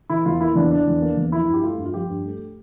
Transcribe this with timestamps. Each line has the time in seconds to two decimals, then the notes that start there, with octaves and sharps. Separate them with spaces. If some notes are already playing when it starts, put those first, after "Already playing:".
0.10 E3 E4
0.26 E2 F4
0.41 A#3 E4
0.56 E2 D4
0.71 E3 D4
0.87 E2
1.02 A#3
1.17 E2
1.32 F3 E4
1.48 G2 G4
1.63 A3 F4
1.78 G2
1.86 F4
1.94 F3 G4
2.10 G2
2.25 A3